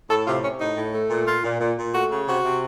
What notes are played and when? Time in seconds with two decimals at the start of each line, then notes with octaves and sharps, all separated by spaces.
0.09 A2 A4
0.26 C3 F4
0.42 C3 C#4
0.59 A2 D#4
0.77 A2
0.94 A3
1.10 A#2
1.26 A#2 F4
1.44 A#2
1.60 A#2
1.77 A#2
1.93 A3 F#4
2.10 C#3
2.27 C3 F#4
2.43 C3